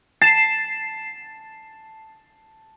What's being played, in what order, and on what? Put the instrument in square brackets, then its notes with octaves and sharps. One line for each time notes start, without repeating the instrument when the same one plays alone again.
[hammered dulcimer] A5 [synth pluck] C7 E7